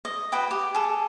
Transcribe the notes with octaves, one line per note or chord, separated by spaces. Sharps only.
D#5
F#4 B4 G5 D#6
G4
G#4 A4